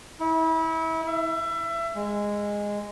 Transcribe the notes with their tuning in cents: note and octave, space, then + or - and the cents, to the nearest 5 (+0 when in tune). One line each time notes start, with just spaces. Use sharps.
E4 -30
E5 +25
G#3 -10